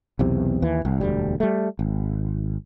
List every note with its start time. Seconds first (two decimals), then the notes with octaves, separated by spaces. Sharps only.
0.19 B1 E2 C3
0.62 D#2 E3
0.85 C2
1.00 E1 D2 G3
1.40 G3 A3
1.79 G#1